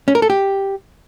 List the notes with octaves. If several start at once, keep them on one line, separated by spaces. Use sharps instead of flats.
C#4
A#4
A4
G4